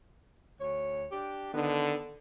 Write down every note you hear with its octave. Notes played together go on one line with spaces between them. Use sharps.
D2 C#5
D4 G4
D3 D#3 B3